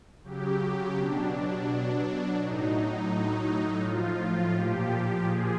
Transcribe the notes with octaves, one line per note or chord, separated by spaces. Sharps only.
C#3 F#3 G4
B2 F#3 D4
B2 F#3
A2 F#3 D#4
A2 F#3
A2 F3 F4
A#2 F3 G4
A#2 F3 G#4